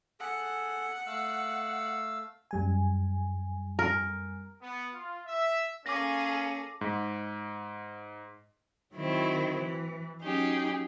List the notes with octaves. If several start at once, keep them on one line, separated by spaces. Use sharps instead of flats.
G#4 A4 F#5
A3 F5 E6
F#2 G3 G#5
A#4
B3
F4
E5
A#3 C#4 G#4 A4 D6 A#6
G#2
D#3 F#3 C4 E4
E3
F#3 C#4 D#4 G4 G#4